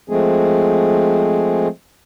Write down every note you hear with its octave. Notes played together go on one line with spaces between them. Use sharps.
F3 G#3 A3 C4 G#4